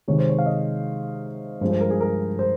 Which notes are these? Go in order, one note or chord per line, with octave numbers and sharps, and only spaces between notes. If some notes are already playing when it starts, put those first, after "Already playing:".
C3 D#3 G#3 C#5
C5
C#5
F5
D#5
G2 F3 G#3 C5
C5
A#4
G#4
A#4
C5